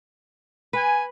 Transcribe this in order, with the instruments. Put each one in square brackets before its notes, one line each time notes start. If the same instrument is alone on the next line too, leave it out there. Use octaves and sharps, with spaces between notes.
[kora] B4 [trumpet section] G#5